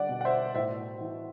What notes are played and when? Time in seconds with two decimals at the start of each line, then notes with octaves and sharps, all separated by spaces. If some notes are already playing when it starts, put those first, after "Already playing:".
Already playing: D3 G3 D5 F#5
0.09 B2
0.21 F#5
0.25 C5 E5
0.55 A2 C5 E5
1.01 E3